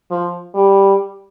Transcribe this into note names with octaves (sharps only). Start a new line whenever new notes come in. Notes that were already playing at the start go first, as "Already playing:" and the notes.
F3
G3